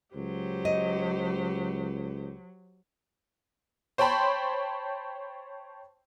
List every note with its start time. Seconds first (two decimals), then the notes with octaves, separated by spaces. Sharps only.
0.15 C#2 F#3 G4 C5
0.65 D#5
3.98 C5 C#5 G5 A5 B5 C6